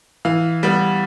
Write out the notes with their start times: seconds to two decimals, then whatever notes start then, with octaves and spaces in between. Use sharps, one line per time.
0.25 E3 F5
0.63 G3 B3